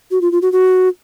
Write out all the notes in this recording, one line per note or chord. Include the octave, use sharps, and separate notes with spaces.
F#4
F4
F4
F#4
F#4